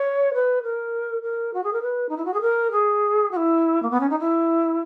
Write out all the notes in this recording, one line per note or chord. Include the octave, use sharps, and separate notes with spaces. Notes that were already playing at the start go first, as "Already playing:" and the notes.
Already playing: C#5
B4
A#4
A#4
F#4
G#4
A#4
B4
D#4
E4
F#4
G#4
A#4
G#4
F#4
E4
A#3
B3
C#4
D#4
E4